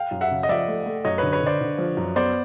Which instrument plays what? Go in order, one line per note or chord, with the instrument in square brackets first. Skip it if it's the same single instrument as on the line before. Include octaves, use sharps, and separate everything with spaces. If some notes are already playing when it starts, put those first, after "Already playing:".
Already playing: [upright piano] F5 G5
[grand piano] F#2
[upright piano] E5 F#5
[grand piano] C#3
[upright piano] D#5
[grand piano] F3 [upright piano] D5 E5
[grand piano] A3
A3
[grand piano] F#2 [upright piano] C#5 D#5
[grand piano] D3 [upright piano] B4 C#5
[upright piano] B4 C#5
[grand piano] D3 [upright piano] C5 D5
[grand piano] D3
F3
F#2
[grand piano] B3 [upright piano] C5 D5